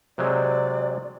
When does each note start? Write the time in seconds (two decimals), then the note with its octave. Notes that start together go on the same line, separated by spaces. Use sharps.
0.18 C3 F#3 G#3 D5